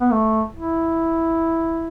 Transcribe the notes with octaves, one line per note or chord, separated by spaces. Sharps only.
B3
A3
E4